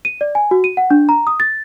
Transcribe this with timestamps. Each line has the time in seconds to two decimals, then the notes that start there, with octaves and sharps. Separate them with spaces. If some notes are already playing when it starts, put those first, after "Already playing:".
0.05 D#7
0.21 D5
0.35 G#5
0.51 F#4
0.64 D#7
0.77 F#5
0.91 D4
1.09 A#5
1.27 D#6
1.40 A6